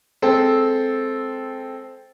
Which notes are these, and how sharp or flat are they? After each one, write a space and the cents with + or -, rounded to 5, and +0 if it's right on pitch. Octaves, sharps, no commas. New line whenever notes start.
G#3 +0 C4 +0 A4 -10